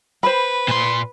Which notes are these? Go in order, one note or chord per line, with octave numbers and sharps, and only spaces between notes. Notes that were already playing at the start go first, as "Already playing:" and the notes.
B4 C5 B5
A#2 C6